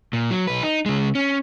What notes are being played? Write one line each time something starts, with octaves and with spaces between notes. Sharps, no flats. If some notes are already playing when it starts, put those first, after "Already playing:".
A#2
F#3
B1 B4
D#4
C#3 G#3
C#4